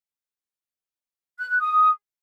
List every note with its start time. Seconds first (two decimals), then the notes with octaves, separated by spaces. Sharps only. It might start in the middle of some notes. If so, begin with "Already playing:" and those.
1.39 F#6
1.50 F#6
1.60 D#6